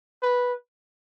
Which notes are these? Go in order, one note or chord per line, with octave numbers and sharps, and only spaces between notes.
B4